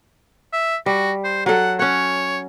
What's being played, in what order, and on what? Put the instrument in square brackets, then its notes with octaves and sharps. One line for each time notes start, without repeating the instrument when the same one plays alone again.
[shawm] E5
[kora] G3 [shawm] F#4
[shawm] C5
[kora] F#3 A4 [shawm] F#5
[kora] C#4 F#5 [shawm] C#5